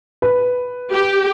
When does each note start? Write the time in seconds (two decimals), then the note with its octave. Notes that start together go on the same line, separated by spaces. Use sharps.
0.22 B4
0.92 G4